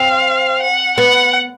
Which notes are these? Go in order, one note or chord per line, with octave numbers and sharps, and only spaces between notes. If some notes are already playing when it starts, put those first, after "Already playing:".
Already playing: C4 F5
F#5
B3 F#5